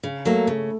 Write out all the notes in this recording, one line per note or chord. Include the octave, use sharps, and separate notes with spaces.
C#3
F#3 A3 A#3
C#3 A3